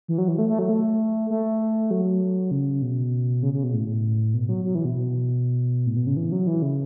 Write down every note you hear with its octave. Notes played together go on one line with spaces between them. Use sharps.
E3
F#3
E3
A3
A3
F#3
A3
A3
F#3
C#3
B2
C#3
C#3
B2
A2
B2
F#3
F#3
E3
B2
B2
A2
B2
C#3
E3
F#3
E3
C#3